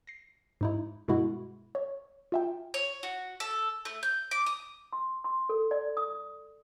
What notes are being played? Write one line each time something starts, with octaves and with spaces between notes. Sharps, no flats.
A#6 C7
G#2 D#4 E4
G2 B2 G#3 E4 F#4
C#5
F4 E5 G5
C#5
F#4
A4
A3
G6
D6
D#6
C6
C6
A4
D5
D#6